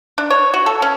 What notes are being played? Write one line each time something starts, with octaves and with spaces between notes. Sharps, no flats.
D4
C#5
F#4
A4
C#4